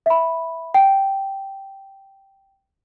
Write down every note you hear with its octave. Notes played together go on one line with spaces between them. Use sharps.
E5 B5
G5